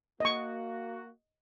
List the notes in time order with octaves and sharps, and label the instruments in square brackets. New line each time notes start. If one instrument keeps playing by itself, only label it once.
[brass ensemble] A#3 F#4 [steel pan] D#5 C#6